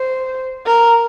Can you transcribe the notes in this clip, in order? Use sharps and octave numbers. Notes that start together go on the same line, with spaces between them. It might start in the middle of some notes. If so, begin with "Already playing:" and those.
Already playing: C5
A#4